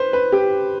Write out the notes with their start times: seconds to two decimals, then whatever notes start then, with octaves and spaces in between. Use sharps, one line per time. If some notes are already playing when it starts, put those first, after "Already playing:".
Already playing: B4 C5
0.13 B4
0.32 G4